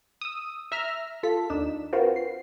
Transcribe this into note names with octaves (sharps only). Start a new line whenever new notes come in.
D#6 E6
E5 A#5 E6 F6
F4 A4 B6
D#2 D4 D#4 E7
C4 F4 F#4 A#4 B4
C7